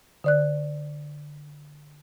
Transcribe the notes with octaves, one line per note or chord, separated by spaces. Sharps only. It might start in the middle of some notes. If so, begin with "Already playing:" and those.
D3 D5 F#6